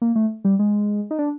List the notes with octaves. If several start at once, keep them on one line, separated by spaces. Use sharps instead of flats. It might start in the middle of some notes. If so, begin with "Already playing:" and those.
A#3
A3
G3
G#3
D#4
D4